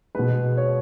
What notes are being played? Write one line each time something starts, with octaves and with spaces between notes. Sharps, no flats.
B2 G#3 B4
C#5